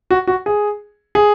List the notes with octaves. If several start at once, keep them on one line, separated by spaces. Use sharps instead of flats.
F#4
F#4
G#4
G#4